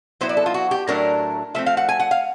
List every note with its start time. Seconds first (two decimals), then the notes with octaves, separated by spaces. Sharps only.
0.21 F#3 B3 E4 C5
0.29 D5
0.37 A4
0.46 F4
0.54 F#4
0.71 G4
0.87 A2 F#3 A3 D4 A#4
1.54 F3 A3 C4 E5
1.66 F5
1.77 F#5
1.89 G#5
2.00 F#5
2.11 F5